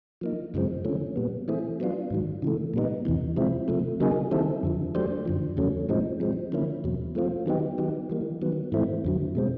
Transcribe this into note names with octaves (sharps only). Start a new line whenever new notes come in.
F3 A#3 D#4
F#2 C#3 F3 G#3 C4
D3 F3 A3 C#4
A#2 G3 B3
E3 A3 C4 E4 G#4
F#3 B3 D4 F4
G#2 D#3 F#3
C#3 E3 A3
A#2 G3 B3 D#4
E2 C3 E3
C3 F3 G#3 C4 E4
C3 F3 A3
C#3 F#3 A#3 D#4 G#4
D#3 G3 C4 E4 A4
F2 D3 F3
F#3 A3 D4 G4 C5
F#2 D3 F3
E2 C#3 F#3 A3 C#4
A2 F3 G#3 C4 D#4
F3 G#3 C4
D3 F3 A#3 C#4 E4
E2 B2 F#3
F3 A3 C4 F4
D#3 F#3 B3 D#4 G4
D#3 F#3 B3 D#4 G4
E3 G3 A#3
D#3 F#3 B3
G#2 E3 A3 C4 E4
F2 D3 F#3
B2 G#3 C4